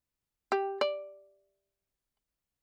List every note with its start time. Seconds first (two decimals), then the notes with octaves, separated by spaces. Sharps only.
0.52 G4
0.81 D5